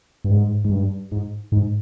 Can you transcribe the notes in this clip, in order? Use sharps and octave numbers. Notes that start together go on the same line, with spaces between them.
G2
G#2
G#2
G2
G#2
G#2